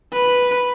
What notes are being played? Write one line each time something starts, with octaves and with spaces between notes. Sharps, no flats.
B4